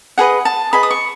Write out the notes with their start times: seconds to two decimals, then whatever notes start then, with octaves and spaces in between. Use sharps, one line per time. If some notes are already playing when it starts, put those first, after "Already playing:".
0.18 G#4 B4 D#5 F#5
0.45 A5
0.73 G#4 B4 D#5 B5
0.83 D#6
0.91 C#6